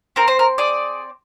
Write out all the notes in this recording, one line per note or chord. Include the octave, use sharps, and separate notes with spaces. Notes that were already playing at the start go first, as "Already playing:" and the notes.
C4 A#4
C5
A#4
G#4 D5